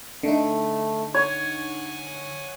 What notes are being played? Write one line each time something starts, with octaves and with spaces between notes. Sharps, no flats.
D3 A3 D#4
C#5 F#5 G#5